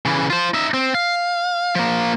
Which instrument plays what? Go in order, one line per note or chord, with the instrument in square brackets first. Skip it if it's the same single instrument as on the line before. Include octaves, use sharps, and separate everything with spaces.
[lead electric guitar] C#3 E3
F4 C5
D#4 E5
C4
F5
F3 A#3